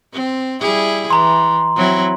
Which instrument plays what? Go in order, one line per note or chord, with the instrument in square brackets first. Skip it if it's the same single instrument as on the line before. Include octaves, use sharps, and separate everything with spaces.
[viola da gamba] C4
G3 E4 G#4
[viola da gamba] E3 [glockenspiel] A#5 C6
[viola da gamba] F#3 C4 E4